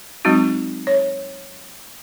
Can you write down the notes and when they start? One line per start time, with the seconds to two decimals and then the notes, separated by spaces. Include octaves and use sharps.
0.25 F#3 G#3 C4 D#4 F#4
0.87 C#5